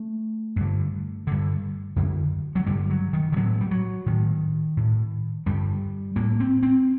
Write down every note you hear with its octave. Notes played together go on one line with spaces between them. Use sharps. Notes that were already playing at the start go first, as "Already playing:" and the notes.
Already playing: A3
G2 D3
G2 D3
F#2 D3
F#3
G2 D3 G3
F#3
D#3
D#3
A2 F#3
G3
F#3
A2 D#3
A2
G2 D3 G3
A2 A#3
C4
C4